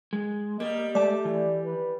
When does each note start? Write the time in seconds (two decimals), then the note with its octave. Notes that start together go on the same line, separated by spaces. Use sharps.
0.13 G#3
0.60 G3 A#3 D#5
0.95 G#3 A3 D5 A5
1.25 E3
1.65 B4